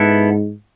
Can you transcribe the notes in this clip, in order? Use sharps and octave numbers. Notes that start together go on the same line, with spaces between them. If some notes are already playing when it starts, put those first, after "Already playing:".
Already playing: G#2 B3 E4 A4